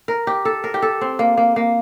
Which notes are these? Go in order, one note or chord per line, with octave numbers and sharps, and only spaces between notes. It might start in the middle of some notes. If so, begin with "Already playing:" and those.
A#4
G4
A4
A#4
G4
A4
C4
A#3
A#3
A#3